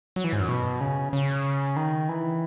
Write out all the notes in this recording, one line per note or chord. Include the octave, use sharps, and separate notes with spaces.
F#3
E3
G#2
F#2
B2
C#3
C#3
D#3
E3